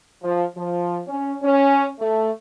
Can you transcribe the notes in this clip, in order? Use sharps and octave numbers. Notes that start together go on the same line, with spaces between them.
F3
F3
C#4
C#4
A3